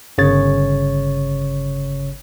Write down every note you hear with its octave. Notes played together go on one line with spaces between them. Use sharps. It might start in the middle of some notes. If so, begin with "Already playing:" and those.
G1 C#3 C#5 A6